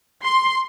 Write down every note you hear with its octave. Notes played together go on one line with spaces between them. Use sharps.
C6